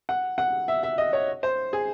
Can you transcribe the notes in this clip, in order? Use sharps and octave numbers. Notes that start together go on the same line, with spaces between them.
F#5
F#5
E5
E5
D#5
C#5
C5
G#4